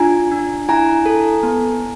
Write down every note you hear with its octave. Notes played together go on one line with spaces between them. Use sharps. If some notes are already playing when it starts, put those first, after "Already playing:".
Already playing: D4 F4 G#5 A#5
D4
E4 G#5 A#5
A4
B3